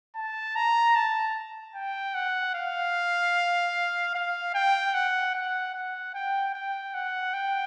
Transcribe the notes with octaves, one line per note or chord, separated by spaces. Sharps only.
A5
A#5
A5
G5
F#5
F5
F5
G5
F#5
F#5
F#5
G5
G5
F#5
G5